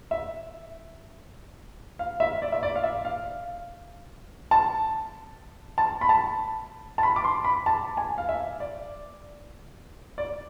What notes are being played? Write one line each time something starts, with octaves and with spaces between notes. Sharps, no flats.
E5
F5
E5
D5
E5
D5
F5
E5
F5
A5
A5
B5
A5
A5
B5
D6
C6
B5
A5
G#5
F5
E5
D5
D5